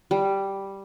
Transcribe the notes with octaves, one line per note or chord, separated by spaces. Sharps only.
G3